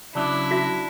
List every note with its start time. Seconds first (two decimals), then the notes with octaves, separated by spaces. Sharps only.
0.15 C#3 F#3 D4 E4
0.51 F#4 E5